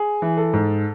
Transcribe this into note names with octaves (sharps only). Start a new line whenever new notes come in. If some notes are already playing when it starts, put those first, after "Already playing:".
Already playing: G#4
E3
A4
G#2